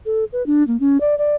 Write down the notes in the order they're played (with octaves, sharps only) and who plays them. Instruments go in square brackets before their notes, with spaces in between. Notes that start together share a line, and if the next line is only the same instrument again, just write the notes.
[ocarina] A4
B4
D4
A#3
C#4
D5
D5